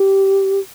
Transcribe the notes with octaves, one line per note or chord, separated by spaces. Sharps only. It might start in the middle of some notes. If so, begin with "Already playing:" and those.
Already playing: G4